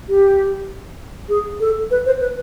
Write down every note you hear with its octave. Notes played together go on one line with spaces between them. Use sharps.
G4
G#4
A4
B4
C5
B4